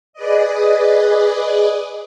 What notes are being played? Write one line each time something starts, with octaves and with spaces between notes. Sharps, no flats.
G#4 B4 D5 D#5